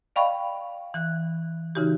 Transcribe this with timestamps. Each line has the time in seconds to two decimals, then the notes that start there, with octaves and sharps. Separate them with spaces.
0.16 D5 D#5 F5 G5 B5 C#6
0.94 E3 F#6
1.75 C#3 E3 D#4 F#4 G4